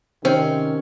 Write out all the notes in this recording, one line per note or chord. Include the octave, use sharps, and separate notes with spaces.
C3 D#3 C4 C#4